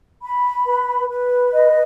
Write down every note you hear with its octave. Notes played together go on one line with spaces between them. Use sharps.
B5
B4
B4
D#5